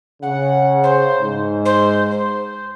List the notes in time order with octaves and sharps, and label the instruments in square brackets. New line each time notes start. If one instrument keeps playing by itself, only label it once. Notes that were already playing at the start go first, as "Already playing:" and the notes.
[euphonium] C#3 [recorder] F#5
[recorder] C5
[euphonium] G#2
[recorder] C5
C5